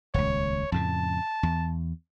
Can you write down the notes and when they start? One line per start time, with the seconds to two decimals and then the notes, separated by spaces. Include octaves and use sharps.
0.14 D#1 C#2 C#5
0.72 F2 A2 C#3 A5
1.43 E2